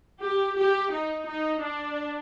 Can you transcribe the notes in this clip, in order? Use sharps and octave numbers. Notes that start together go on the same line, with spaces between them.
G4
G4
D#4
D#4
D4